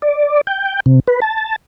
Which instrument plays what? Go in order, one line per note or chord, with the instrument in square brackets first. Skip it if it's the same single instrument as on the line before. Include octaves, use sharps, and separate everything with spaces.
[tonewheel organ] D5
G5
C3
B4
A5